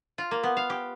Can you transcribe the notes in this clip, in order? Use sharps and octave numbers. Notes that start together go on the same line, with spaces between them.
F4
A#3
B3
F5
G4